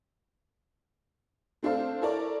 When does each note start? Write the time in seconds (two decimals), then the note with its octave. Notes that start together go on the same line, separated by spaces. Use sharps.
1.63 A3 C4 D4 A4 C5 F5
2.02 E4 A4 A#4 C#5 D5